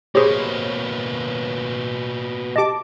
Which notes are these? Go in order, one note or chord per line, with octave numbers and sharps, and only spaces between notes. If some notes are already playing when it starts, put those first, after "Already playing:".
B2 A#3 G4 G#4 C5 C#5 B5
G4 D#5 A5 D6